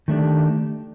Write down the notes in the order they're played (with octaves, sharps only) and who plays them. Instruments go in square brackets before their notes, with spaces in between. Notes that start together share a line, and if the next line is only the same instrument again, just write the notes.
[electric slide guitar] D#3 A3 D4 G4